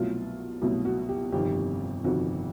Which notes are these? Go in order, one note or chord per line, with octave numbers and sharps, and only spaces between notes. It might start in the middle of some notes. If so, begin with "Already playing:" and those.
Already playing: C2 B2 F#3 A3 F4
C2 B2 F#3 A3
F#4
G4
G1 F2 C3 D#3 G4
G1 F2 C3 D#3 F#4